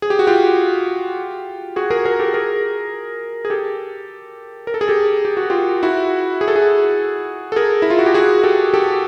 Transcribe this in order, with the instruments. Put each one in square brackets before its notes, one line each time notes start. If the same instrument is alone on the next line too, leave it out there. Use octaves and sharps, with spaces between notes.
[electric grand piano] G#4
G4
F#4
F4 G4
F#4 G#4
G#4 A#4
G#4 A#4
G4 A4
G#4 A#4
G#4
G4 A4
A#4
A4
G#4
G4 A4
G4
F#4
F4 G4
E4 F#4
G#4
A4
F#4 G#4
A4
G#4 A#4
E4
F4
F#4
G4
F#4 G#4
G4 A4
G4 A4